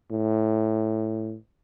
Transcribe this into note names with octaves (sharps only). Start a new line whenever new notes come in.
A2